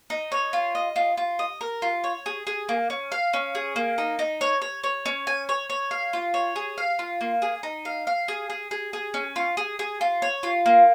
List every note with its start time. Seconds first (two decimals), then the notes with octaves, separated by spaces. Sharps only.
0.10 D#4
0.32 C#5
0.53 F4
0.75 D#5
0.96 F4
1.17 F4
1.39 D#5
1.61 A#4
1.82 F4
2.04 C#5
2.26 G#4
2.47 G#4
2.69 A#3
2.90 C#4
3.12 F5
3.33 C#4
3.55 G#4
3.76 A#3
3.98 D#4
4.19 D#4
4.41 C#5
4.62 C#5
4.83 C#5
5.06 C#4
5.27 G#5
5.49 C#5
5.70 C#5
5.91 F5
6.13 F4
6.34 C#5
6.56 G#4
6.78 F5
6.99 F4
7.21 A#3
7.42 G#4
7.63 D#4
7.85 F5
8.07 F5
8.28 G#4
8.50 G#4
8.71 G#4
8.93 G#4
9.14 C#4
9.36 F4
9.57 G#4
9.79 G#4
10.01 F4
10.22 C#5
10.43 F4
10.66 A#3